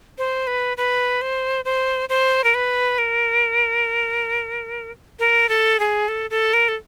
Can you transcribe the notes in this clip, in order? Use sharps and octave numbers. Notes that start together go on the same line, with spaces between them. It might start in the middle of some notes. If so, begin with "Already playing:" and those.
C5
B4
B4
C5
C5
C5
A#4
B4
A#4
A#4
A4
G#4
A4
A4
A#4
A4